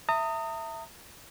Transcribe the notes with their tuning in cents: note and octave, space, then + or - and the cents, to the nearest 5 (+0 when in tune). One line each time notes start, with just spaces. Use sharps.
E5 +0 A#5 -40 D#6 +0